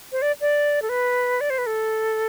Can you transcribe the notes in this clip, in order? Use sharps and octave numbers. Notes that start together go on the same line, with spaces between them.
C5
D5
D5
A4
B4
D5
C5
B4
A4